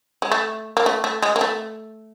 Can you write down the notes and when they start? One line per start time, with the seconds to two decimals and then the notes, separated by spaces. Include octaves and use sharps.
0.22 G#3
0.32 A3
0.77 A#3
0.86 A3
1.04 A3
1.22 G#3
1.36 A#3
1.41 A3